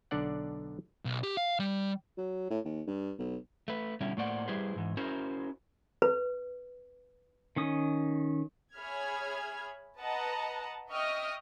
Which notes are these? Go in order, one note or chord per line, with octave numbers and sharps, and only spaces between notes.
B1 D3 D4 D5 F#5
B1
G4
F5
G3
F#3
A2
D#2
G2
B1
A3 B4
B2 D3 G3 C#4 E4
A2 A3 A#3 C5 D5 F#5
G3 E4 G#4 B4 C5
G#2 E3
C#4 E4 F#4 A#4 C5
B4
D#3 C#4 D#6
G#4 C#5 E5 B5 F6 G#6
B4 D#5 F#5 A5 A#5
D#5 E5 G5 C#6 D#6 F6